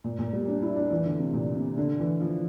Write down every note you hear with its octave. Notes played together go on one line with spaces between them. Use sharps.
A#2
A#2
G3
D4
E4
D4
E3
D3
C3
A#2
C3
D3
E3
F3